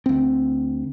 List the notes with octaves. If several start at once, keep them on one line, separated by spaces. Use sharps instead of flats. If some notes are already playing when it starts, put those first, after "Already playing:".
D2 C4